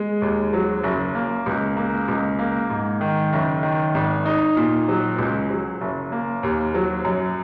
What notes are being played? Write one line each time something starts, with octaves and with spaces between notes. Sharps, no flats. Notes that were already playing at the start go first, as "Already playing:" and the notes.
Already playing: G#3
D#2
F#3
F#1
A#3
C#2
A#3
C#2
A#3
G#2
D#3
F#1
D#3
G#1
D#4
A#2
F#3
C#2
F#3
F#1
A#3
D#2
F#3
F#2